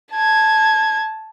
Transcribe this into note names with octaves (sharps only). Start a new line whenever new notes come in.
A5 G#6